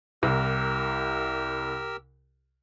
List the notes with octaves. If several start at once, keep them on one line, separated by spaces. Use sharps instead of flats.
C2 G4 A#4 E6